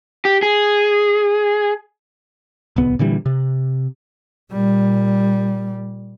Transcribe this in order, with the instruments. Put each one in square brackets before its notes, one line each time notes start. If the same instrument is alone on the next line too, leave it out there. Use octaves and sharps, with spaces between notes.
[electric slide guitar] G4
G#4
[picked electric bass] D1 C2 B3
A#2 D3 E3 G3
C3
[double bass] A#2 G3